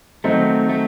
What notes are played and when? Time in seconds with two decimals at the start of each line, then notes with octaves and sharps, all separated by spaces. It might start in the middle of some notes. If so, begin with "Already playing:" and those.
0.24 D#3 F#3 A3 C4 D#4
0.69 A3